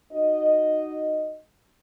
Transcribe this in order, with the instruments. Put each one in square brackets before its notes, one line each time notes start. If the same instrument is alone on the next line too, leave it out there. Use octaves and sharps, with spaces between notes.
[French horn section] D#4 F#4 D#5